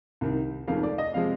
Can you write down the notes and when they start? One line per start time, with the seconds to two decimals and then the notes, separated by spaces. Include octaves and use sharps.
0.21 C2 C3 D#3
0.68 F1 F2 D#3 G#3 F5
0.83 D5
0.98 D#5
1.14 C3 F3 G#3 F5